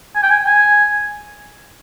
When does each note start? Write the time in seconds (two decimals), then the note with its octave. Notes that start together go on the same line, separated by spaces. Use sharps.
0.15 G#5
0.23 G5
0.31 G#5
0.46 G#5